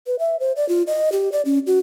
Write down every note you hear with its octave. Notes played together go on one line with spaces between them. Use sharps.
B4
E5
C5
D5
F4
D#5
G4
D5
C#4
F#4